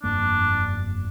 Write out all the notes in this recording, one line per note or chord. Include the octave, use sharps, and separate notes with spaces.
F1 G2 A#3 D4